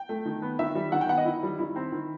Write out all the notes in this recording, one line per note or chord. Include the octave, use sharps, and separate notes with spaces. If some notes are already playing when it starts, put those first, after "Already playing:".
Already playing: G5
A3
D#3
B3
D#3 E5
G3
D#3 F#5
G5
B3 F#5
D#5
D#3 E4
G3
D#3 E4
C4
D#3